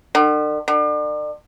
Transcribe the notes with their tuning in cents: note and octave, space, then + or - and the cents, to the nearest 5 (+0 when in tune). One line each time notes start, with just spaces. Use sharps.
D3 +45
D3 +35